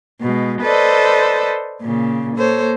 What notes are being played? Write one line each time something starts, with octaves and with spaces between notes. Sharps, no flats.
B2 G#3
A4 B4 C5 D5 D#5
A#2 C#3
A#3 A4 C5 C#5